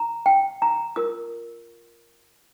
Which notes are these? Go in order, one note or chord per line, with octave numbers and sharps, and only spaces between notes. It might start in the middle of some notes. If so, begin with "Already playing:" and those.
Already playing: A#5
G5
A#5
F4 A#4 D#6